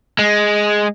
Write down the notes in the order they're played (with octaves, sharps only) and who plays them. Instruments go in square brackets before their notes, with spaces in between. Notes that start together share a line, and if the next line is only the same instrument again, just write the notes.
[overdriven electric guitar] G#3